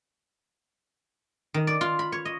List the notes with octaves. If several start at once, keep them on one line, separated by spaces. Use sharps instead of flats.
D#3
D5
F4
B5
C#5
D#5